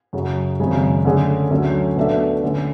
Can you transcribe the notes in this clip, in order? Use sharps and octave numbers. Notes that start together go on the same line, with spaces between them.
F#2 C#3 F#3
G#1 F#2 C#3 G#3
D3 A3 C#4 G#4
D2 D3 F#3 A3 C#4
B2 A3 D4 A4 E5
D3 A3 C#4